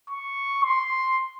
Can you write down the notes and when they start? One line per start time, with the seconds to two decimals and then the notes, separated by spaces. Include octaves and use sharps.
0.10 C#6
0.63 C6